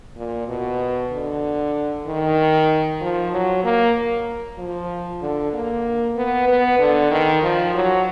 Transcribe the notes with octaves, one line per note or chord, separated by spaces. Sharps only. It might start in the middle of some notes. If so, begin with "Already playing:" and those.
A#2
B2
D3
D#3
F3
F#3
A#3
F3
D3
A#3
B3
B3
D3
D#3
F3
F#3